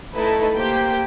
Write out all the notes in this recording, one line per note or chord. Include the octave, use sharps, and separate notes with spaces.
A3 D#4 E4 A4 B4
A#3 G4 C5 G5